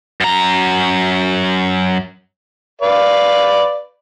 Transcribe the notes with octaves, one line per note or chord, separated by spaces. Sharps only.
F#2 A#5
B4 D5 F5